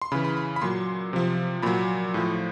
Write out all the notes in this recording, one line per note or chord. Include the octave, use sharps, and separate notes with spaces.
C6
C#3 E3 B5
B5
B5
B5
A#2 F#3 C6
C3 F3
A#2 F#3 B5
A2 F3